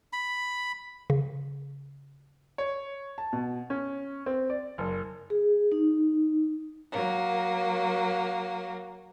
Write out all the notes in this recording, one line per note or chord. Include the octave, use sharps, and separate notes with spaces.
B5
C#3
C#5
A5
B2
C#4
C4
D5
F#1
G#4
D#4
F#3 A#3